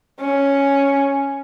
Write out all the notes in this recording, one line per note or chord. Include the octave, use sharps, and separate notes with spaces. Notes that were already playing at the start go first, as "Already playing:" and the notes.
C#4